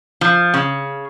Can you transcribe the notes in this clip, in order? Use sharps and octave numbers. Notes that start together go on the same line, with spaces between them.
F3
C#3